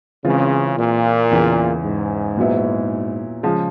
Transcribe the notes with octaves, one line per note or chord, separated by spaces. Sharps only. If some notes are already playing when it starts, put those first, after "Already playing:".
C#3 E3 G#3 C4 F4
A#2
E2 C#3 E3
G#2
A#2 F#3 B3 E4
C#3 F3 G#3